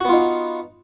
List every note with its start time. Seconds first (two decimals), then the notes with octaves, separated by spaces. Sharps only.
0.01 F#4
0.05 B3
0.09 F4
0.13 D#4